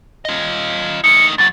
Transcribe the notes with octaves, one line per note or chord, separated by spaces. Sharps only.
F4 D#5
A3 D#4 C#7
E2 F#3 A6